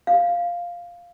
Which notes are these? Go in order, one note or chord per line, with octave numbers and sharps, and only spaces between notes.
F5